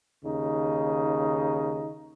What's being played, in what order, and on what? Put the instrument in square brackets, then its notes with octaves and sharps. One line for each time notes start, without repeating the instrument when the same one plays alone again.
[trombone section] D#2 C#3 D#4